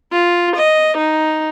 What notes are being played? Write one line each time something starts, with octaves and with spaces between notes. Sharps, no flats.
F4
D#5
D#4